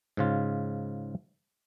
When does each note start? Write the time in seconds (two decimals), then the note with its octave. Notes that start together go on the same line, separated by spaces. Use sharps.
0.17 G#2 C#3 F4